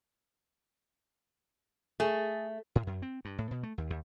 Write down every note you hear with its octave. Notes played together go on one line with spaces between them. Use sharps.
A3 G#4
A2
F#2
C4
G2
A2
B2
A3
D#2
D#2